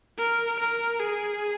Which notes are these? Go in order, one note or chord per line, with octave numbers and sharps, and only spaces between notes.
A#4
A#4
G#4